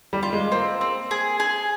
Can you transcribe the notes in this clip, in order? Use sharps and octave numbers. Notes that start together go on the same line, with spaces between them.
G3
F4
G#3
A#3 C4
C4
G#4
G#4